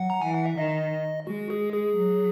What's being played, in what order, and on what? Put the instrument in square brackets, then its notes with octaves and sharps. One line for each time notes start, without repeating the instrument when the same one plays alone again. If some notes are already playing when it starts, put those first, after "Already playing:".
Already playing: [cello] F#3 [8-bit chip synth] F#5
[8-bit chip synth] A#5
[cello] E3 [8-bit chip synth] G#5
[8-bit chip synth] F#5
E5
[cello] D#3 [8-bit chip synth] D#5
[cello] G#3 [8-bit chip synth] F#4
[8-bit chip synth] G#4
G#4
[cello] F#3